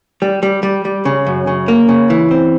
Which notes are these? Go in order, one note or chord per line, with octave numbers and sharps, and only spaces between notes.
G3
G3
G3
G3
C#3
F#2
C#3
A#3
C#3
E3
C4